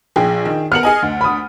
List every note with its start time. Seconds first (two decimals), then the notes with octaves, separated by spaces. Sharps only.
0.16 A#1 G#4 G5
0.45 D#3
0.72 B3 A#4 F6 C#7 F#7
0.83 G#4 D#5 G#5
1.02 D2
1.21 B5 D#6